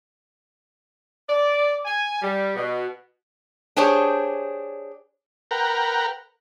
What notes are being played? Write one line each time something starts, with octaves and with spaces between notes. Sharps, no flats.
D5
G#5
G3
B2
D4 G4 G#4 C5 C#5
A#4 B4 F#5 G5 A#5